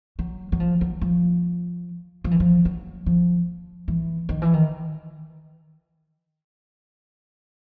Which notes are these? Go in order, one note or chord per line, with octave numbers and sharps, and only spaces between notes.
F#3
F#3
F3
F#3
F3
F3
E3
F3
F#3
F3
E3
D#3
E3
D#3